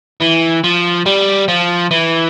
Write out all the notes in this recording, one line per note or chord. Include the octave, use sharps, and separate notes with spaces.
E3
F3
G3
F3
E3